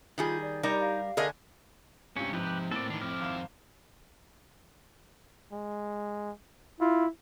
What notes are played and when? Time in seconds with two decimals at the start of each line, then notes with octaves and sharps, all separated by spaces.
0.18 D#3 G3 F4 G#4
0.42 D5
0.63 G3 D#4 A#4 A#5
0.80 F5
1.17 D3 A3 G#4 A#4 D#5 G#5
2.17 G2 C3 G#3 C#4 F5
2.33 G#2 C3 F3 G4 B4
2.71 A2 A#3 C4 A4 D5
2.90 D#3 E3 D4
3.01 F2 C4 E4 D6 F6
3.20 G#1 F5 E7
5.52 G#3
6.81 E4 F4